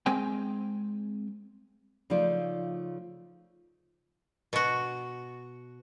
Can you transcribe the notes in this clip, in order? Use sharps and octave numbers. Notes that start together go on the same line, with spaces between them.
G#3 C4 G5 G#5
C#3 F3 A3 D#4 F4 D5
B2 F#4